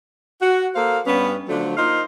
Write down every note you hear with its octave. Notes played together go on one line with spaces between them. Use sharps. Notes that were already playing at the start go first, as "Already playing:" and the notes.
F#4
A#3 A4 C5 F5
G2 B3 C#4
D3 F3 F#3 A3 D4
A#3 D#4 F4 C5 D#5 F5